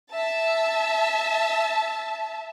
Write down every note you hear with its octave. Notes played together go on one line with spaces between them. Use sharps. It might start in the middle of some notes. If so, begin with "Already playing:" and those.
E5 A5